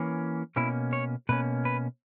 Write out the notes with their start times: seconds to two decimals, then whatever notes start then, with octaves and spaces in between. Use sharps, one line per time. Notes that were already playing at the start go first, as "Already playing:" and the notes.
Already playing: E3 A#3 C#4
0.56 B2 A#3 C#4 E4
0.93 C#5
1.29 B2 A#3 C#4 B4
1.65 B4